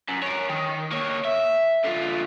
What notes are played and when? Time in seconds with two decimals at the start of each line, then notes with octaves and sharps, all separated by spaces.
0.09 F#2
0.22 A#4 C#5
0.49 D#3
0.92 A#3 C#5
1.25 E5
1.84 D3 F4